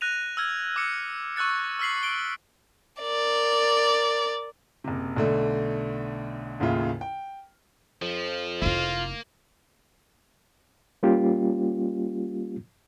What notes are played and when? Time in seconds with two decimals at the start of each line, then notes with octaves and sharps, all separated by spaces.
0.01 F#6 A#6 D#7 F7
0.37 E6 F6 G#6
0.76 D6 E6 C#7
1.36 C#6 E6 F#6 A6 C#7
1.79 E6 F6 B6 C7 F#7
2.03 D7 G7
3.02 A#4 D5
4.84 F#1 C3
5.17 B1 D3 A3
6.60 A1 D#2 C#3 F4 E5
7.01 G5
8.02 F2 F3
8.62 F1 A#3 E4 F4
11.03 G3 A#3 C#4 F4 G4